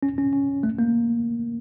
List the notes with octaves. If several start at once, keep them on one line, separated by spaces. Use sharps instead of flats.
C#4
C#4
C#4
A3
A#3